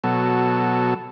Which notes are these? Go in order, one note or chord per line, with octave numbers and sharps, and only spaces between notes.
B2 F#3 A4